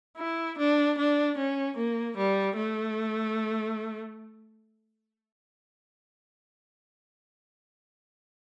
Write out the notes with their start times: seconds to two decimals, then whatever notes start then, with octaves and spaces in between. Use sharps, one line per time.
0.18 E4
0.58 D4
0.98 D4
1.38 C#4
1.77 A#3
2.17 G3
2.56 A3